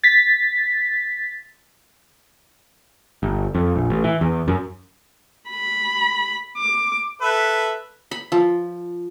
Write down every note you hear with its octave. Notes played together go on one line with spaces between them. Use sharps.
A6 B6
G1
F2
A#1
A1
E3
E2
F#2
B5
D6
A4 B4 E5
B5
F3